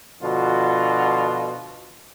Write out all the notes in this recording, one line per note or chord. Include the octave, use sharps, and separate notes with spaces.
B2 D3 F3 F4 F#4